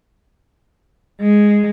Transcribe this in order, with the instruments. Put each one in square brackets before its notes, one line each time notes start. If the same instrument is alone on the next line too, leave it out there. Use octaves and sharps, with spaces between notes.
[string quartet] G#3